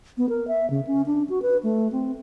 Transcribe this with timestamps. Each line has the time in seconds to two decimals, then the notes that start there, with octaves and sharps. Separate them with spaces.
0.18 B3
0.29 A#4
0.48 E5
0.70 C#3
0.87 C#4
1.06 D4
1.29 F#4
1.42 B4
1.63 A3
1.92 C4